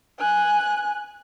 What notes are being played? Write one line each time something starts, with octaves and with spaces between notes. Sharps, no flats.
G#5 F#6